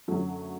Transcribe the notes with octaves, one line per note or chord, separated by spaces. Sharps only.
F#2 D3 F#3 A3